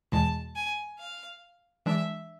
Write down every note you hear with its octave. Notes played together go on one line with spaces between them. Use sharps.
E2 B2 G#3 A5
G#5
F5
E3 G#3 D4 E5